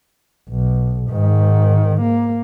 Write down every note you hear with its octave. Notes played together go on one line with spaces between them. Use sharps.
B1
G#2 D#3
A#3